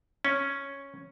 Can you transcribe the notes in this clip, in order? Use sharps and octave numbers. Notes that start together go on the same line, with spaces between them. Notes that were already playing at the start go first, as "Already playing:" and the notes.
C#4